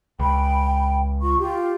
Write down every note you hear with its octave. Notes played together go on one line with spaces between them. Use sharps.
C#2 G5 B5
F4 C#6
F4 G4